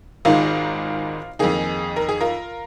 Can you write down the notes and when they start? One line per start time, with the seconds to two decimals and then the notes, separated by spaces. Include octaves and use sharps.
0.25 G#1 G#2 D#3 G#3 F4 A#4
1.39 F2 D#3 A#3 D#4 G#4
1.96 A#4
2.09 G#4
2.21 F4 A#4